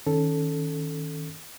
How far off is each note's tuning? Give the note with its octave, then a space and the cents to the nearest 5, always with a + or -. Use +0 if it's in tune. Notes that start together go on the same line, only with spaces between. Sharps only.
D#3 +15 C#4 +0 A4 +0